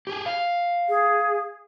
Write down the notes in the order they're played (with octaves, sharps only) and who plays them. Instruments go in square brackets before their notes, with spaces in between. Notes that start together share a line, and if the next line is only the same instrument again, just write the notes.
[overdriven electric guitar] G4 G#4
F5
[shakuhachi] G#4